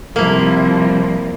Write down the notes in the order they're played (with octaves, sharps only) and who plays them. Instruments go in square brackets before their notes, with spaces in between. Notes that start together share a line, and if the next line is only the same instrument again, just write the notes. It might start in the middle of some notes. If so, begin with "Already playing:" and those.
[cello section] C3 F3 G3 [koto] A#3 E4